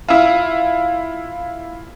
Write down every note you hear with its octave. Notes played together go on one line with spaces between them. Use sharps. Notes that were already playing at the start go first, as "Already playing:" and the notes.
E4 F4